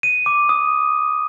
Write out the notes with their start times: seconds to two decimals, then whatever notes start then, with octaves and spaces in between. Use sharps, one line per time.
0.03 D#7
0.26 D6
0.49 D#6